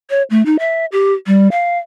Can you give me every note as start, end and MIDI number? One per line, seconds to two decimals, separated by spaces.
0.10 0.23 73
0.30 0.45 57
0.46 0.57 63
0.59 0.85 76
0.92 1.13 67
1.27 1.48 55
1.51 1.78 77